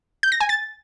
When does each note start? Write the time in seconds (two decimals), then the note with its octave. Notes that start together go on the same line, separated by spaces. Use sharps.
0.23 G6
0.32 A#6
0.40 G#5
0.49 A6